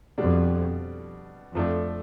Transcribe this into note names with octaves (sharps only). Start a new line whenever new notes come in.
F2 B2 G3 D4
F2 F3 A3 D4